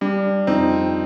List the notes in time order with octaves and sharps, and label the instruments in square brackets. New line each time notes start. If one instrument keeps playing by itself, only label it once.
[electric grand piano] G3 [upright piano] D4
[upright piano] F2 [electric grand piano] C4 D#4